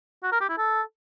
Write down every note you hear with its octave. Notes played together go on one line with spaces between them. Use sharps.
F#4
A#4
G4
E4
A4